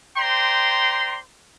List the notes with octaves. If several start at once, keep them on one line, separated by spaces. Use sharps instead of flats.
C5 D5 G5 A#5 C6